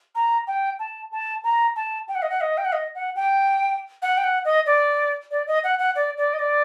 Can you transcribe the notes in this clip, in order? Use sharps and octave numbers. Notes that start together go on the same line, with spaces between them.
A#5
G5
A5
A5
A#5
A5
G5
F#5
D#5
F#5
D#5
G5
F#5
D#5
F#5
G5
F#5
G5
F#5
D#5
D5
D5
D#5
F#5
F#5
D5
D5
D#5
D5